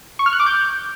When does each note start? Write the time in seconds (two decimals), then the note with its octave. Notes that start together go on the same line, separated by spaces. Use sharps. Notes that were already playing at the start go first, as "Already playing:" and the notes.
0.19 C#6
0.26 F6
0.33 F#6
0.40 D6
0.46 G6